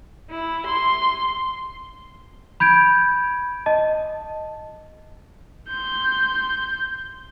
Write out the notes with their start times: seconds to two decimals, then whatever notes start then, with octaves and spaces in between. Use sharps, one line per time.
0.30 E4
0.68 C6
2.60 B5 G6 G#6 D7
3.66 D#5 A5
5.69 C6 G6